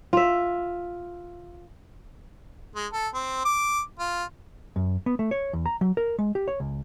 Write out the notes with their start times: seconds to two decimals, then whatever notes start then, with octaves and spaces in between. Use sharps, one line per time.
0.13 F4 E5
2.75 G#3
2.93 A4
3.14 C4
3.45 D6
3.99 F4
4.76 F#2
5.06 B3
5.19 A3
5.31 C#5
5.53 E2
5.66 A#5
5.81 F#3
5.97 A#4
6.19 G#3
6.35 G4
6.48 C#5
6.60 C#2